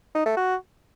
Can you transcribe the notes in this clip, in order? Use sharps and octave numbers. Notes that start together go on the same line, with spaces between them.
D#4
A3
F#4